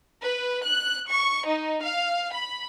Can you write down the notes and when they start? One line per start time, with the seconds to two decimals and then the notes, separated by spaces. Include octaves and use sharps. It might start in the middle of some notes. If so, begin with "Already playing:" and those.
0.23 B4
0.64 F#6
1.10 C#6
1.47 D#4
1.84 F5
2.34 B5